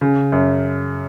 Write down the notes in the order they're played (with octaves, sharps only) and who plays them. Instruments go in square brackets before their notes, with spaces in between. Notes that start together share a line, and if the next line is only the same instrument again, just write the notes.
[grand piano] C#3
F#2